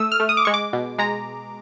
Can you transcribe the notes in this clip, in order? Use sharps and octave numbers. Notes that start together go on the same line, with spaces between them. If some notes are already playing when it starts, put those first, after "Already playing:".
Already playing: A3 D#6 E6
F6
A3
D#6
D6
G#3 C#6
D6
B2
G#3 A#5